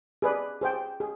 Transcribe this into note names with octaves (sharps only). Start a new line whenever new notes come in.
G#4 B4 D5
G#4 C5 G5
G#4